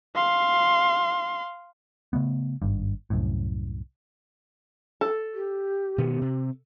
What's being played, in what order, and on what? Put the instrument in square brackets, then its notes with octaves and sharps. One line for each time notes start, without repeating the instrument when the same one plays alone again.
[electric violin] F5 C6
[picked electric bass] C#3 A3 B3
G#1 G2
C2 F#2 A2
[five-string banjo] A4
[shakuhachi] G4
[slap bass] B2 D#3 B3
C3